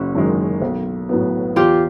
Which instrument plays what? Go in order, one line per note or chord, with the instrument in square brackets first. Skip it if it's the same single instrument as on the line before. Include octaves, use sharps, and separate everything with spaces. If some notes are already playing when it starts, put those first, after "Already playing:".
Already playing: [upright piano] F#1 [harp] E4 F#4
[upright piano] F#2 D#3 G#3
B1
A2 F#3 B3
[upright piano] E2 [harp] F4 G4